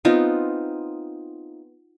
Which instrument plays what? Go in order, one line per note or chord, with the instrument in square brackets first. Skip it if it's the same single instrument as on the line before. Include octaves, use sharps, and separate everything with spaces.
[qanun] B3 C4 D#4 F4